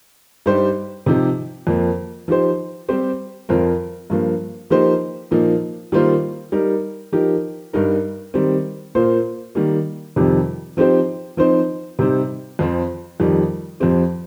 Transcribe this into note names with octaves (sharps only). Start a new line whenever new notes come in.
G2 G3 D#4 G4 C5
C3 F3 D#4 G4
F2 F3 A#3
F3 D#4 G4 C5
G3 C4 G4 C5
F2 F3 C4 F4 A#4
G2 F3 A#3
F3 A#3 D#4 G4 C5
A#2 F3 A#3 D#4
D#3 G3 A#3 F4 C5
G3 D#4 A#4
F3 D#4 G4 A#4
G2 G3 D#4 A#4
D#3 G3 C4
A#2 A#3 F4 C5
D#3 G3 A#3
F2 C3 D#3 G3
F3 C4 D#4 G4 C5
F3 C4 D#4 C5
C3 G3 C4 D#4
F2 F3 C4
F2 D#3 G3
F2 F3 C4 G4